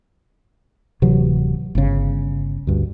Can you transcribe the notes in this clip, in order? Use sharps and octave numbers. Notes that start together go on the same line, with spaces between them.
D1 C3 E3 F#3
G1 C#3
D2 G2